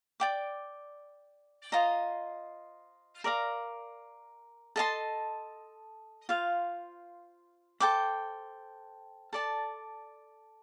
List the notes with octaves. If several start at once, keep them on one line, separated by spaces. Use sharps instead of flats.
D5 G5 D6
F4 C5 D#5 A#5
A#4 D5 F5 A#5
A4 D#5 A5 C6
F4 C5 F5
A4 C5 G5 D6
A4 D5 A5